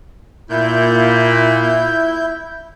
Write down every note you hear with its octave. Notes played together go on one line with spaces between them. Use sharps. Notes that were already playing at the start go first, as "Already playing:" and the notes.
A#2 E4 G6